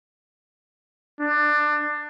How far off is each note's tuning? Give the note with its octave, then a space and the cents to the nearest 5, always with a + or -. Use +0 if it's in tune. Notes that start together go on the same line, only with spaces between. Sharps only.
D4 +20